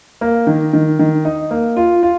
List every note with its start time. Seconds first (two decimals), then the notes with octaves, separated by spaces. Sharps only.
0.21 A#3
0.47 D#3
0.73 D#3
0.99 D#3
1.25 D#4
1.51 A#3
1.77 F4
2.03 F4